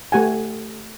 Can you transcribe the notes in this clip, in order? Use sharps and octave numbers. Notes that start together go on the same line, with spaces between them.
A3 G4 F#5 G#5